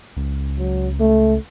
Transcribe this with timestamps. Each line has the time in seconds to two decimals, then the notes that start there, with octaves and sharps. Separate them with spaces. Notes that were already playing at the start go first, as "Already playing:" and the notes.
0.17 C#2
0.59 F#3
1.00 A3